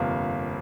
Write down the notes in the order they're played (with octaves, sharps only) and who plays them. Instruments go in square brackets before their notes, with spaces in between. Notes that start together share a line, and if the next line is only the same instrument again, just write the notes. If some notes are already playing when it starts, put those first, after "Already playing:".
Already playing: [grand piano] G1 F2 C3 A#3 F4